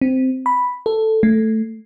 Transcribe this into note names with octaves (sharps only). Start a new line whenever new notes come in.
C4
B5
A4
A3